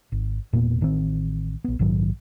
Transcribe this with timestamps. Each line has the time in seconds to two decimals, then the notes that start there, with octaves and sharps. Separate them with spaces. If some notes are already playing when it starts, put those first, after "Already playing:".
0.12 G#1
0.53 E1 A#2 A#3 B3
0.81 A1 D#3 F#3 C4
1.64 A#1 B3
1.79 A#1 G#2 D#3 F#3